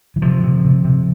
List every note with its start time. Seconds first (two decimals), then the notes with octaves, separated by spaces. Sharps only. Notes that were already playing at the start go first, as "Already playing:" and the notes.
0.16 E3
0.22 C3 F3
0.43 C3
0.65 C3
0.85 C3